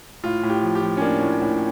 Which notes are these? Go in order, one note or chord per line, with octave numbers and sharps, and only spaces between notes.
A2 F4
A2
G4
F3
G4
F3
C#4
A#3 D4
A2
A2